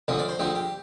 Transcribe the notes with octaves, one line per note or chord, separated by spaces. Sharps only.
D2 D3 F3 D4
D5
C5
D2 D3 F3 G4
G4